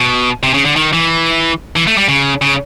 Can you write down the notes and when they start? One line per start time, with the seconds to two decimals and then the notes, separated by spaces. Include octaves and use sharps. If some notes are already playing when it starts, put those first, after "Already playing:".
Already playing: B2
0.43 C3
0.54 C#3
0.65 D3
0.76 D#3
0.93 E3
1.76 E3
1.87 A3
1.98 G3
2.09 C#3
2.42 C#3